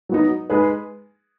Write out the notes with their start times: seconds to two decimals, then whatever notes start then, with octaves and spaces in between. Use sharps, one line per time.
0.09 F#3 B3 D#4
0.50 G#3 D#4 G#4 B4